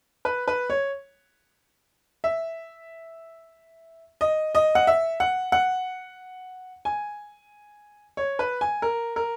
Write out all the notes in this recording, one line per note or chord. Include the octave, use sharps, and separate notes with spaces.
B4
B4
C#5
E5
D#5
D#5
F#5
E5
F#5
F#5
G#5
C#5
B4
G#5
A#4
A#4